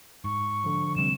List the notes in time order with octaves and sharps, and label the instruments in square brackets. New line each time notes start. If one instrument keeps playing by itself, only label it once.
[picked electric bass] G#2 [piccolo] C#6
[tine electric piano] D3 F3
[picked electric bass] C3 G3 C4 [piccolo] E7